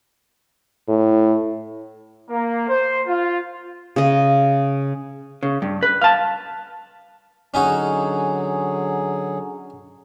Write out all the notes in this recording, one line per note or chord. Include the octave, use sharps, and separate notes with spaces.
A2
A#3
C5
F4
C#3 D#5
C#3
G2
B4
F5 A5
D3 F#3 C#4 D#4 F#4 G#4